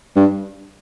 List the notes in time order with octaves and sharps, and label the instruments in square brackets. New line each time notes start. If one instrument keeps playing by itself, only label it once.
[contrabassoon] G2